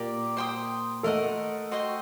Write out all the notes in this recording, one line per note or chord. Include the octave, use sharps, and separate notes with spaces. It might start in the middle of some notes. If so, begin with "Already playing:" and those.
Already playing: A#2 A#3 G4 A#4 D5
C5 G5 C6 D#6
A3 A4 A#4 D#5 F#5
F#4 C5 D#5 G5